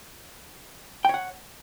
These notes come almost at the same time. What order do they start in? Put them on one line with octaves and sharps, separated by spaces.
G5 C#5 F#5